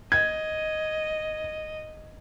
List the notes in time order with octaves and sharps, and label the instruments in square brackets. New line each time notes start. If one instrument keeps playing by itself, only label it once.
[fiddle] D#5 [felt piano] G#6